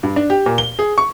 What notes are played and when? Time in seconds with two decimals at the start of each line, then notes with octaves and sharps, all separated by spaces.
0.03 G2
0.16 D4
0.30 G4
0.46 A#2
0.58 G7
0.79 G#4
0.98 C#6